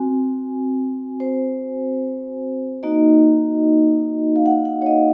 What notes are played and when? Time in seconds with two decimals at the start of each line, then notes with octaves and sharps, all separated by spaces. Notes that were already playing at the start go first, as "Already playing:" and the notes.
Already playing: C4 F#4 G#5
1.20 C5
2.83 A#3 D#4 F#4 D#5
4.36 F5
4.46 F#5
4.65 F#5
4.82 C#5
4.86 D#5